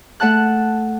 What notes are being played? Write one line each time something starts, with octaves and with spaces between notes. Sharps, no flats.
A3 F#5 A5 F#6